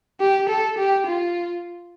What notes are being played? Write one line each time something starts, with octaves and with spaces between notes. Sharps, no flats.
G4
A4
G4
F4